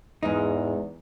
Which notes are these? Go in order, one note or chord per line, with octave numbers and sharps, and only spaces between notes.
E2 G#2 D#4